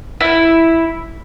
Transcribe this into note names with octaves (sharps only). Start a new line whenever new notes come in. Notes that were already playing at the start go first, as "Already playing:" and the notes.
E4